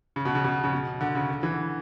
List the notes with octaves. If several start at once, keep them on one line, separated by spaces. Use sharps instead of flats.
C#3
B2
C#3
B2
C#3
B2
D3
C#3
D3
E3